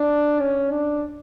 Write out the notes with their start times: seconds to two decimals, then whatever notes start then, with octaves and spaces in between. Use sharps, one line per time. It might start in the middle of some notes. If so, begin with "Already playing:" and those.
Already playing: D4
0.40 C#4
0.71 D4